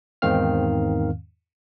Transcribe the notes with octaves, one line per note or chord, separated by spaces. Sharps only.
E2 G#2 D#3 C4 F5 F6